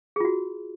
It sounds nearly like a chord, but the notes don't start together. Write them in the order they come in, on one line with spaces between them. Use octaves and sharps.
G#4 F4 F#4